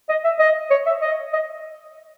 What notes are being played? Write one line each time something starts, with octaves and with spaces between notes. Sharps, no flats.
D#5
E5
D#5
C#5
E5
D#5
D#5